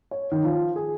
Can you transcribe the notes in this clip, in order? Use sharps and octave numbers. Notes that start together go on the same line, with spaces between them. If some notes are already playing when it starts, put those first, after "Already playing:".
C#5
D#3
F3
G#4